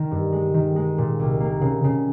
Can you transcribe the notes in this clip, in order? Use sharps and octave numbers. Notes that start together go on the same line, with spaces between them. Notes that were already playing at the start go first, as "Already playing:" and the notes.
Already playing: D#3
G2
G#3
D#3
G#3
A#2
C2
A#3
C#3
C#3